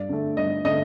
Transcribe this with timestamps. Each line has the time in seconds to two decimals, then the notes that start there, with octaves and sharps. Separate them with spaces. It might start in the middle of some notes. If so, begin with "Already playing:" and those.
Already playing: G2 D5
0.09 D3 A3
0.37 G2 D#5
0.65 D3 A3 D#5